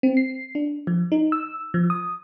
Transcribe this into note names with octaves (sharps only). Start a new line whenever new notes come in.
C4
C7
D4
F3
D#4
E6
F3
D#6